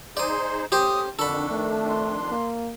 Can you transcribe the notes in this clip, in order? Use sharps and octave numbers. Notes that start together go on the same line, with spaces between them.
D#4 G#4 C5 D5 C6 D#6
A3 C#4 G4 C5 D#6
F2 D3 D#3 D4 A4 B5 C#6
A3
C6
A#3